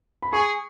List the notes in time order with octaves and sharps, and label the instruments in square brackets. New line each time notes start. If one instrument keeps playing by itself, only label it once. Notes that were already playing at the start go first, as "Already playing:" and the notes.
[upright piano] B5
[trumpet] G#4 [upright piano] C#6